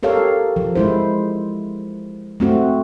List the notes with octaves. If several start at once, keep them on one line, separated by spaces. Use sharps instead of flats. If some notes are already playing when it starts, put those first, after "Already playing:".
G4 A4 A#4 C#5 F5
F3
G#3 E4 C5
A3 C4 F#4